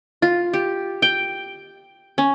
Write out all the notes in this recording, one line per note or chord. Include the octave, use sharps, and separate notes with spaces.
F4
G4
G5
C#4